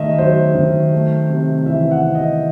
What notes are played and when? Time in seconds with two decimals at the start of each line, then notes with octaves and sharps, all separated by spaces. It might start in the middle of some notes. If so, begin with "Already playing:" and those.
Already playing: D#3 A3 D#5 E5
0.18 F#3 C5
0.55 D#3
0.92 A3
1.30 C3
1.66 E3 E5
1.91 F#5
2.04 C3
2.15 D#5